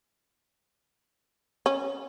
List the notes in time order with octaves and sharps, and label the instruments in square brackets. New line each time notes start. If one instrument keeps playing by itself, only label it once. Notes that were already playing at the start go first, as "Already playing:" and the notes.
[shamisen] C#4